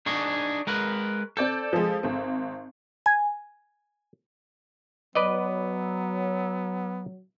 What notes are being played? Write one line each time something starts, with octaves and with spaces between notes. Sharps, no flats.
D4 D#4 G#4 C#6
G#3 A#4 B4
C4 A4 D5 G6
F3 G#3
G#1 C4
G#5
F#3 B3 B4 D5 D#5